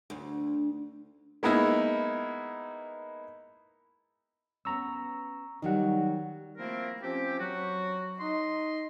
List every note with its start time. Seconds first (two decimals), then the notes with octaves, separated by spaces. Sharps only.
0.10 D2
1.43 G#3 A#3 B3 D#4 E4
4.65 B3 C#4 A#5 C#6 E6
5.62 D#3 F#3 G3 D#4 F#5
6.58 F3 A3 A#3 C4 E4 A#4
7.03 F3 C4 C#4 G4
7.39 F#3 F#4
8.20 D#4 D#5 C6